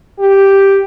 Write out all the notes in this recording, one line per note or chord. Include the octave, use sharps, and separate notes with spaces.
G4